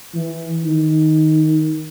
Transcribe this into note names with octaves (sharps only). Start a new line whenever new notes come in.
E3
D#3